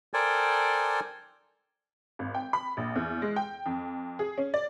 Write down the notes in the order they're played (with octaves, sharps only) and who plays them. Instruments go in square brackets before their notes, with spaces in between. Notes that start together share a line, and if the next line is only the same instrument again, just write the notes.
[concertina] A4 A#4 C5 D5 G5 G#5
[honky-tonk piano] G#1
G5
B5
A#1
E2
G#3
G5
F2
G#4
C#4
D5